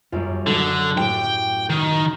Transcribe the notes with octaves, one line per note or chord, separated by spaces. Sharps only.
F#2 G3 F4
D3 F#3 A4
A2 G4 G5
D#3